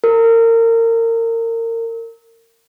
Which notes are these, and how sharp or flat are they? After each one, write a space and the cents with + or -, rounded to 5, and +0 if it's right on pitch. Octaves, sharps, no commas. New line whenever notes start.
A#4 -30